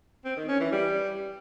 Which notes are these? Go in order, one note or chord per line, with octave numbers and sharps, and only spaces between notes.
C4
D#3
C#4
E3
G3